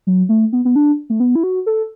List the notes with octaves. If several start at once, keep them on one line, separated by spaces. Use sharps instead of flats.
F#3
A3
B3
B3
D4
A3
B3
E4
F#4
A4